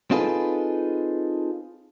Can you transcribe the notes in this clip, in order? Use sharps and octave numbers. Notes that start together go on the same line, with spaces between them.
C4 D#4 F4 G#4 A4 B4